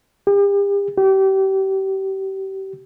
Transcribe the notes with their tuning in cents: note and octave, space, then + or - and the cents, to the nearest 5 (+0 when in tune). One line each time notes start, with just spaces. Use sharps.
G4 +40
G4 -30